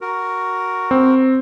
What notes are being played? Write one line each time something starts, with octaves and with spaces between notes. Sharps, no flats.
F#4 A#4
C4